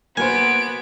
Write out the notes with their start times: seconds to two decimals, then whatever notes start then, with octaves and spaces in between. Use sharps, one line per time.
0.17 A#3 B3 F#4 C5 G#5 D7